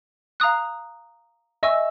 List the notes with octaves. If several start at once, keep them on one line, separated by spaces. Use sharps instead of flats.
F5 A#5 D#6 F#6
D#5 E5 G#5 C#6 E6